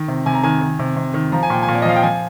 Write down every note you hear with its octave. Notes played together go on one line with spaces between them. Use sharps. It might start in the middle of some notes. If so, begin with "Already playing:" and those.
Already playing: D#3
C3
C3 G#5
A#5
D#3 G#5
D#3
C3
C3
D#3
F3 A#5
G#5
A#2 G5
G#5
A#2
D5
D#5
F3 F5
G5
F3 G#5